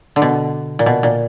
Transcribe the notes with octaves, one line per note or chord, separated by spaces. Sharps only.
D3
B2
A#2
B2
A#2